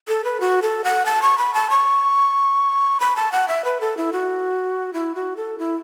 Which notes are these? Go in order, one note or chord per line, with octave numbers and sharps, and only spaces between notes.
A4
B4
F#4
A4
F#5
A5
C#6
B5
A5
C#6
B5
A5
F#5
E5
B4
A4
E4
F#4
E4
F#4
A4
E4